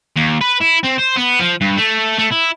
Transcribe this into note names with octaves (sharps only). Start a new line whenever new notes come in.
D#2
B4
E4
C4
C5
B3
F3
G2
A3
A3
E4